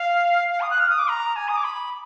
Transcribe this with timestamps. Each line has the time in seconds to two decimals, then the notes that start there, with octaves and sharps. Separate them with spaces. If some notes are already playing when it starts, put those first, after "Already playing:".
Already playing: F5
0.52 F5
0.61 D#6
0.71 F#6
0.80 F6
0.90 D#6
0.99 D6
1.08 A#5
1.36 G#5
1.48 D#6
1.57 D6
1.64 B5